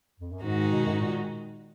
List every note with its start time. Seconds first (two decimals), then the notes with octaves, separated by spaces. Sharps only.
0.20 F2
0.32 F#2
0.42 G#2 D#3 G#3 D#4 F#4
0.72 B2
0.86 F#2
0.93 G#2
1.00 A#2